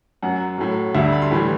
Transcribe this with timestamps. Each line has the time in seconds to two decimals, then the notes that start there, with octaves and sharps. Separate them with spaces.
0.22 F#2 F#3 F#5
0.58 A2 F#3
0.94 D2 D3 G3 E5
1.12 B5
1.22 C6
1.31 A2 E3 G3